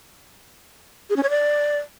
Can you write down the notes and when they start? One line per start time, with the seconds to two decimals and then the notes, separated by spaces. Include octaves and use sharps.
1.10 G#4
1.16 C#4
1.23 C#5
1.30 D5